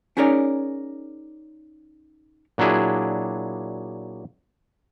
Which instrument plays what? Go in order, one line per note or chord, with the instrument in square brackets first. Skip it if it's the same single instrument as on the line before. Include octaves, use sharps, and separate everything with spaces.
[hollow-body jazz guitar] C#4 D#4 G#4 A#4 C#5 D5
[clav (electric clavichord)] A#2 F#3 D4 E4 G#4